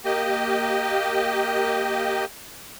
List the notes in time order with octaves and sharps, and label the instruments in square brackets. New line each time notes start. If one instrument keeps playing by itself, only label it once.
[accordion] A#3 G4 D#5